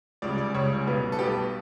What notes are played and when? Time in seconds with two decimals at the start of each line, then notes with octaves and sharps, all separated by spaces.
0.22 C#2 C#3 G3 D5
0.38 D5
0.54 C#2 C#3 G3 C#5
0.86 B1 B2 G3 B3
1.12 A4
1.19 B1 B2 G3 B3 G4